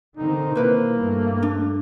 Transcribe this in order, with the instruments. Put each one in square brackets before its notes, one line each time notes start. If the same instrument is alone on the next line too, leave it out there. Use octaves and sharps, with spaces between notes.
[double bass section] D3 D#3 C4 [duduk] D#4
[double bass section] B2 [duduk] A#3 [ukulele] E4 B4 C5
[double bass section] G2 A3
[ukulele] D4